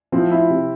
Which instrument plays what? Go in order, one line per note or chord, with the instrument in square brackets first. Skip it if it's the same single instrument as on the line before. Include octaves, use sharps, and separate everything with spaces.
[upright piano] F3 [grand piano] C4 E4
[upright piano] E4
C3